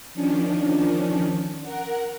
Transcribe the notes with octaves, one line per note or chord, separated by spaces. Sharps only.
D#3 F3 C#4 D4
A#4 F#5